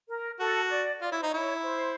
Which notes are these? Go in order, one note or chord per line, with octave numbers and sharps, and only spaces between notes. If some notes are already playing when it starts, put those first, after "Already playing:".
A#4
F#4 A4
D5
F4 D5
E4 C#5
D#4 C5
E4 C#5
C5